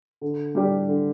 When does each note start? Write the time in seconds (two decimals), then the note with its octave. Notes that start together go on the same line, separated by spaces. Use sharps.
0.21 D3
0.55 G3 D4 G4
0.88 D3